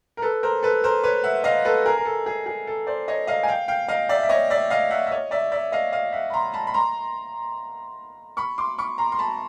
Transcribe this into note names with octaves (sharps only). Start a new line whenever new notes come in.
A#4
A4 B4
A#4 C5
A4 B4
A#4 C5
B4 C#5
E5 F#5
D#5 F5
A4 B4
G#4 A#4
A#4
A4
G#4
G#4
A4
C5 D5
C#5 D#5
D#5 F5
G#5
F5 G5
F5 G5
D#5 F5
D5 E5
E5
C#5 D#5
D5 E5
D#5 F5
E5 F#5
E5
C#5 D#5
D5 E5
D5 E5
D#5 F5
D#5 F5
E5 F#5
B5
A#5 C6
A5 B5
B5
A#5 C6
B5 C#6
C6 D6
B5 C#6
A#5 C6
C6
A5 B5